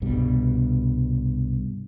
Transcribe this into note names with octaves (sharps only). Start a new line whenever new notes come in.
C2 G2 B2 G3